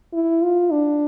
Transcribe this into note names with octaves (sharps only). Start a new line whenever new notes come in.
E4
F4
D4